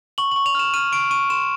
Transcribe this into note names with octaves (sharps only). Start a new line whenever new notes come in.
C#6 F#7
F#7
C#6
F7
F6 E7
F6 D#7
C#6 D7
C#6 D#7
C6 E7